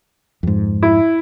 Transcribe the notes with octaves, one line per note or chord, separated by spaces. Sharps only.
F2 G#2
E4